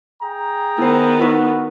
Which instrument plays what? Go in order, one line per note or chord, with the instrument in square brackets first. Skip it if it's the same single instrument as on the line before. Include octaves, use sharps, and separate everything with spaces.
[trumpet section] G#4 G5 A#5
[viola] D#3 B3 [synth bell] E4 C5
[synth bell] D#4 E4 B4 [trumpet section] F#4